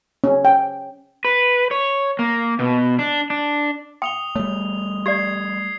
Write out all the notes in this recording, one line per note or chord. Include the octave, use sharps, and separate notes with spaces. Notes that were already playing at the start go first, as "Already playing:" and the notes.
C#4
G5
B4
C#5
A#3
B2
D4
D4
G5 D#6 F7 G7
G3 A3 C#5
G4 D5 G#6 C7